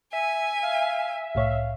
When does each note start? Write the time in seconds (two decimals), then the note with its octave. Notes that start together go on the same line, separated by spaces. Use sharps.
0.13 E5 G#5
0.63 F5
1.35 C2 A2 C#5 F5